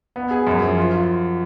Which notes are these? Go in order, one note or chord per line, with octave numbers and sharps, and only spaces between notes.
B3
G#4
F#2
F3
F4
F4